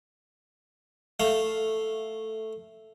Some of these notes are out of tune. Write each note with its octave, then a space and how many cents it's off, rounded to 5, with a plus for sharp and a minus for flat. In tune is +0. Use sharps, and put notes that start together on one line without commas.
A3 +0 F5 +0